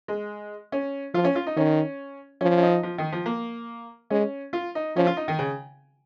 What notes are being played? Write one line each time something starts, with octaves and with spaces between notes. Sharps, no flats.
G#3
C#4
F3 F4
C#4
F4
D#4
D#3 C#4
F3 C#4
C#4
D#4
F3
D#3
F3
A#3
G#3 C#4
F4
D#4
F3 C#4
F4
D#4
D#3
C#3